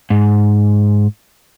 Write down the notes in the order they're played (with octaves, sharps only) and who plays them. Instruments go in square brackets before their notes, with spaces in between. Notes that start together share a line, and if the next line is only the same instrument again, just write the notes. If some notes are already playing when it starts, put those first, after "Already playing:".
[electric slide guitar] G#2